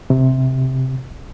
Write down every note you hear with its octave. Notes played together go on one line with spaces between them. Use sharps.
C3